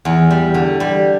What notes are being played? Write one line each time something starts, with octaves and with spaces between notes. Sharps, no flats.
E2
G3
D3
G3